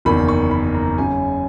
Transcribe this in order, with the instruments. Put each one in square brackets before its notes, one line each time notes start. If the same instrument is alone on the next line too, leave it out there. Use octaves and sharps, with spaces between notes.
[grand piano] F#1 E2 D#3 A#3 B5
C#6
B5
A#5
F#1 F#2 C#3 G#5